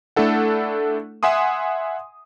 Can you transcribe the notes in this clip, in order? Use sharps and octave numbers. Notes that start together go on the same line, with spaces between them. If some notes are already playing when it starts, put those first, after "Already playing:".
A3 D4 E4 A4 F#5
E5 F#5 G#5 C6 D#6